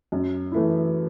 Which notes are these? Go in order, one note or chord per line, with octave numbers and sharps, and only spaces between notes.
F#2
E3 A3 E4